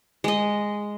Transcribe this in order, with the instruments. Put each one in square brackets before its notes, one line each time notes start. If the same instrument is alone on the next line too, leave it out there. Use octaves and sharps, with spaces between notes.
[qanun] G#3 D#5